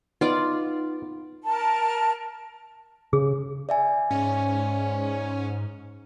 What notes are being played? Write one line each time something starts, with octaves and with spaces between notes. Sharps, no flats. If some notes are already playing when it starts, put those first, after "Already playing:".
B3 D#4 F4 D5
A#4 A5
C#3 G#4
D5 E5 G#5
G#2 C#4